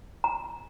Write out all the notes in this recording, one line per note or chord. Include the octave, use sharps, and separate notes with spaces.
A#5